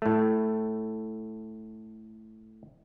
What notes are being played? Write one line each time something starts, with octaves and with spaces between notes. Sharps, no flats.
A2 A3